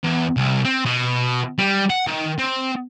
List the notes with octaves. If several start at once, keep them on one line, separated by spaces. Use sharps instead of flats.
E2
C2
C4
B2
G3
F#5
D#3
C4